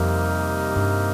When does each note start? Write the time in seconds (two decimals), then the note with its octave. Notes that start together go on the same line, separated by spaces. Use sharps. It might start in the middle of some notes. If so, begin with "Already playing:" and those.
Already playing: F2 C3 G3 A#3 D#4
0.76 G2